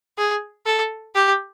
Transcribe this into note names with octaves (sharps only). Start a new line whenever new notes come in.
G#4
A4
G4